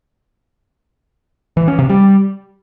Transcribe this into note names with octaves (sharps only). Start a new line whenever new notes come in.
E3
C#4
C3
G3